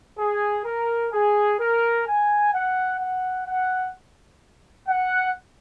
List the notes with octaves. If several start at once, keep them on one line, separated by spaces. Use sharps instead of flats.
G#4
A#4
G#4
A#4
G#5
F#5
F#5
F#5
F#5